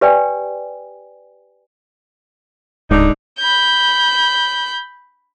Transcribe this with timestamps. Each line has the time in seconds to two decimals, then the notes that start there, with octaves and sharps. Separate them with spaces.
0.01 G4 B4 D5 G5 G#5
2.91 D1 G#2 D3 D4 D#4
3.40 B5 G6